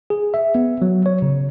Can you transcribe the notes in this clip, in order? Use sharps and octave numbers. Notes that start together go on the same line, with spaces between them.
G#4
E5
B3
F#3
C#5
C#3